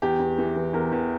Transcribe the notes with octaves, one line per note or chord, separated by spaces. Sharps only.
E2 G4
E2
E3
E3
E2 A#4
E2